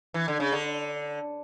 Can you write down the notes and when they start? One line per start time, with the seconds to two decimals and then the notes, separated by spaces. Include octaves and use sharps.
0.14 E3
0.28 D3
0.40 C#3
0.52 D3